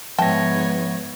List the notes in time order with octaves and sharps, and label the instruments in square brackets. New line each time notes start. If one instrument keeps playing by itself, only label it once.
[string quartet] G#2 B3 C#5 [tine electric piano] F3 E5 A#6 [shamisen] G5 A5